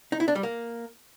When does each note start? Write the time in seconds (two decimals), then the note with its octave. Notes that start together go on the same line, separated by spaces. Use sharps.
0.12 D#4
0.20 E4
0.28 D4
0.36 G3
0.43 A#3